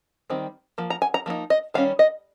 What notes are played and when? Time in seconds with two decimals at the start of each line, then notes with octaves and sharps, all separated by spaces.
0.30 D#3 G3 C4
0.78 F3 A#3
0.90 A#5
1.02 G#5
1.14 A#5
1.26 F3 A#3 D#4
1.50 D#5
1.74 D#3 G3 C#4 F5
1.99 D#5